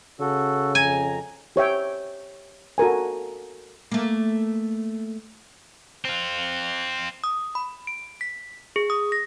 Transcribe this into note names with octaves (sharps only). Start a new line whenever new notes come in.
C#3 F#4 A4
F2 G#5 A#5
G4 C#5 E5 G5
F#4 A4 A#4 G#5
A3 A#3
C4 F4
D#6
B5
D7
B6
G#4
D#6
A#6